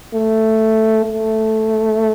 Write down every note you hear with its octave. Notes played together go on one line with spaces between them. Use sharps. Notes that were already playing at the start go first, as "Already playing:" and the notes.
A3
A3